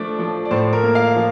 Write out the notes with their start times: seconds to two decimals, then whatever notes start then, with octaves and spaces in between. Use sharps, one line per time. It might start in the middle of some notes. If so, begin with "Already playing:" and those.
Already playing: F3 A3 D4 D5
0.19 F3
0.45 D5
0.51 A2 C5
0.73 A#4
0.83 A#3
0.95 F5
1.16 F3